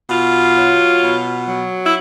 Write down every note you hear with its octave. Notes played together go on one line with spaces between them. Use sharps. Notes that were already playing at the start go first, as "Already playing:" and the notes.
B2 F4
F#3
B2
F#3
E4